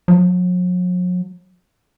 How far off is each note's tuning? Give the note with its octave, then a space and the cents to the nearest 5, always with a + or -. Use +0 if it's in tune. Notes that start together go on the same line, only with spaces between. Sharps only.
F#3 -45